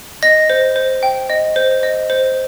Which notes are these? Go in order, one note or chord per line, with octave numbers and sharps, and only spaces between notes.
D#5 A#6
C5
C5
G5
D#5
C5
D#5
C5